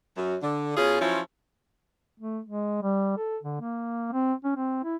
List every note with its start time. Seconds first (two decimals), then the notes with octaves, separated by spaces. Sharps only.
0.17 F#2
0.42 D3
0.77 B2 C#4 F4 G#4
1.01 F3 F#3 C#4 E4 F4
2.20 A3
2.45 G#3
2.83 G3
3.17 A4
3.43 D3
3.61 A#3
4.12 C4
4.44 C#4
4.56 C4
4.84 E4